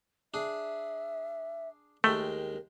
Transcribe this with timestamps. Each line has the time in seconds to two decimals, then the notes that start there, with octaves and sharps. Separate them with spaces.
0.34 D4 G#4 E5
2.04 D#2 G#3 A3 A#4 G5